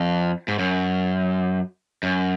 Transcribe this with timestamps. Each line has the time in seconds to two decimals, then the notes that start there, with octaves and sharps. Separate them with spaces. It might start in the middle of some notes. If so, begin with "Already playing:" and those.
Already playing: F2
0.48 G#2
0.59 F#2
2.03 F#2